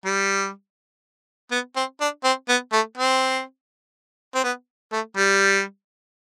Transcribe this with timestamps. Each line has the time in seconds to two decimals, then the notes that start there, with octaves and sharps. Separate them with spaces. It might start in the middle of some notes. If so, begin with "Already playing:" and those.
0.05 G3
1.52 B3
1.76 C4
2.01 D4
2.24 C4
2.49 B3
2.73 A3
2.97 C4
4.35 C4
4.44 B3
4.93 A3
5.17 G3